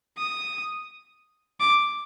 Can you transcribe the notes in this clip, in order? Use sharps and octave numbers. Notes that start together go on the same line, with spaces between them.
D#6
D6